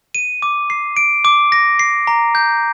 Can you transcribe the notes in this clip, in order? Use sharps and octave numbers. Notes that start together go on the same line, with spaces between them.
D#7
D6
C7
D7
D6
A#6
C7
A#5
G6